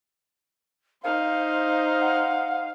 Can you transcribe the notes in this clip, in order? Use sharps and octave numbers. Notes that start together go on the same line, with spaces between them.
D#4 C5 F5
F#5